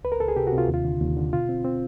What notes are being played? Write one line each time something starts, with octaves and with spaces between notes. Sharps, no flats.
C#2 B4
A#4
C#2 A4
G#4
C3 G4
F#4
C3
F4
D#2 F4
D3
D#2
D3
B2 F4
C4
C4